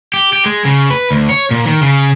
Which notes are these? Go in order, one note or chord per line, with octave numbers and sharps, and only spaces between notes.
G4
G4
G#3
C#3
B4
D2
C#5
A#2
D#3
C#3